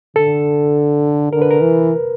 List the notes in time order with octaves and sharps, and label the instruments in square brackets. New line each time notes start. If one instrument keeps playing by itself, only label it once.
[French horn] D3 [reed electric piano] A4
[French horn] D3 [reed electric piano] A#4
[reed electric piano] B4
A#4
[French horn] E3